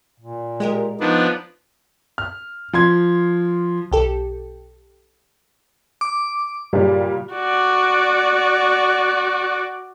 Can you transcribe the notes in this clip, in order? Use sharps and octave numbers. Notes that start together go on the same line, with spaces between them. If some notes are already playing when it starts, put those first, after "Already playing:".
A#2
G#3 G4 A#4
F3 B3 D4 D#4
F6
F3 C6 G#6
B1 G4 A4
D6
G2 A#2 C#3 G3
F#4 D5